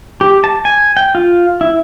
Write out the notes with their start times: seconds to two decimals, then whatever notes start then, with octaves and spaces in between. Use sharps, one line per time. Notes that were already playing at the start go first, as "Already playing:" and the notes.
0.21 G4
0.44 A5
0.65 G#5
0.97 G5
1.15 F4
1.61 E4